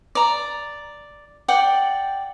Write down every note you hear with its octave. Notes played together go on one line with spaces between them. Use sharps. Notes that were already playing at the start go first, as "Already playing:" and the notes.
D5 A#5
D5 F#5 G5